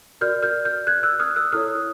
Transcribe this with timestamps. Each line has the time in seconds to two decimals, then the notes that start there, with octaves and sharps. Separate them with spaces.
0.21 F#4 A#4 D5 F6 G6
0.43 F6 G6
0.65 F6 G6
0.87 F#6 G#6
1.03 E6 F#6
1.19 D#6 F6
1.36 E6 F#6
1.52 E4 A4 C#5 D#6 F6